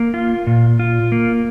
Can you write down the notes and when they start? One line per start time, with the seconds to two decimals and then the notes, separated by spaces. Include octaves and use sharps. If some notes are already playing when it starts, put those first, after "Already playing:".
Already playing: A#3
0.14 F4
0.47 A#2
0.79 F4
1.12 A#3